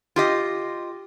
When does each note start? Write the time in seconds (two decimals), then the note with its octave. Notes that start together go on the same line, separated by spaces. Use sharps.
0.16 F4 G4 D#5